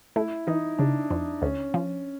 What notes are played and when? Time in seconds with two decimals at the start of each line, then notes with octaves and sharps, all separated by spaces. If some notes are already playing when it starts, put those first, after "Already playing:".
0.16 A3 E4
0.47 E3 D#4
0.79 C#3 D4
1.10 F2
1.42 D2 C#4
1.74 F3